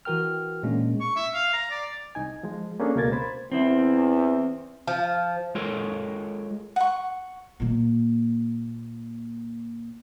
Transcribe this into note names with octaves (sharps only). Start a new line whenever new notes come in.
E3 F#4 A#4 G5 F6
A#2 G#3 A#3 C#4 D4
C#6
E5
F5
A#5
D5
C2 D#4 G#5
F3 G#3
A#3 C#4 D4 G#4 A4
C#2 B2 A#3 A#4 G#6 A6
C5 B5
E2 C4 E4
F3
G#3 F4 A4 A#4 C#5
F#5 C#6
A#2 A#3